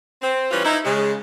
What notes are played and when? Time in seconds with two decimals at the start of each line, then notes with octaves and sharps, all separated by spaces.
0.22 C4
0.51 E3 G3 C#4 F4 B4 C5
0.64 D#4 E4
0.85 C#3 G#3